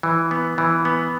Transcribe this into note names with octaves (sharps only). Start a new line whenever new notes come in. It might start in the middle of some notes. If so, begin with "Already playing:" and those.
E3
B3
E3
B3